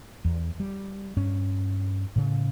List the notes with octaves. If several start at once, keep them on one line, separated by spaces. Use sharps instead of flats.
E2
G3
G2 C#4
A2 C#3